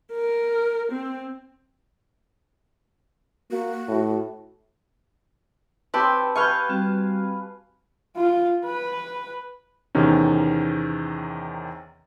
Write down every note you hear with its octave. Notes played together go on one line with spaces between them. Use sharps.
A#4
C4
A#3 F#4
A2
C4 F#4 G4 B4 A5
B4 F5 G#5 C#6 F6 G6
G3 C4 F#4
F4
B4
E2 C3 D#3 C#4